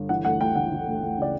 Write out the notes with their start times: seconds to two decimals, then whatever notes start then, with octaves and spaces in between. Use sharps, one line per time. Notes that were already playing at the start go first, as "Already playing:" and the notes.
Already playing: G1
0.09 E3 F#5
0.25 D2 F#5
0.40 D2 G5
0.55 E3 F#5
0.72 E3
0.87 D2
1.02 D2
1.18 C#3 D5